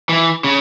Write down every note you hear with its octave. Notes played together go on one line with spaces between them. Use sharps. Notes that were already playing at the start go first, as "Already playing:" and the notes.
E3
C#3